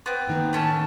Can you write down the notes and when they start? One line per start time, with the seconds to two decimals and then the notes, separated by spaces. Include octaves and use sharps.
0.06 B3 C4
0.27 A2 D#3 A#3
0.53 A3 C#4 A5